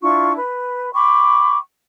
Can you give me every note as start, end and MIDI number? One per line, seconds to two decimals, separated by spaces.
0.02 0.36 62
0.02 0.36 64
0.02 0.36 65
0.02 0.36 85
0.36 0.91 71
0.36 0.91 83
0.93 1.57 79
0.93 1.57 83
0.93 1.57 85
0.93 1.57 86